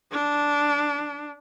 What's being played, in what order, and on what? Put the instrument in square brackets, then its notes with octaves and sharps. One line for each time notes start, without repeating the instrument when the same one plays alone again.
[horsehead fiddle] D4